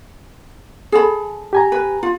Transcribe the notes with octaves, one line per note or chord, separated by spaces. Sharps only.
G#4 A4 B5
G4 G#5 A#5
B4
F4